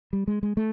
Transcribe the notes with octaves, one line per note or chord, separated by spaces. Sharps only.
G3
G#3
G#3
A3